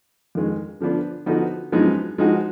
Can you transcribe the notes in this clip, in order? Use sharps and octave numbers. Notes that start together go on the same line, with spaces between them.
F2 D#3 G#3
D3 F3 B3 D4
D3 F3 B3 D#4 F#4
F#2 F3 G#3 B3 D#4
F3 G#3 D#4 F#4